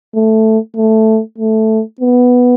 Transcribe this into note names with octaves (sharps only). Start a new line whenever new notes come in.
A3
A3
A3
B3